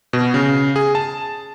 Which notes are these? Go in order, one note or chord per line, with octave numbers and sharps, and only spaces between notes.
B2
C#3
G#4
A5